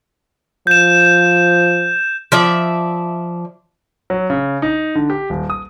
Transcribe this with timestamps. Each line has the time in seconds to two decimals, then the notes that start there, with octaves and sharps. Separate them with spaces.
0.67 F3 G6 E7
2.32 F3 D5 E5
4.10 F#3
4.30 C#3
4.62 D#4
4.95 D3
5.10 G4
5.30 D#1
5.50 D#6